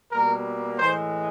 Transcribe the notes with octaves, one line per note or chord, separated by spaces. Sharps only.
B2 G3 A#3 A#4
A2 E3 G#3 C5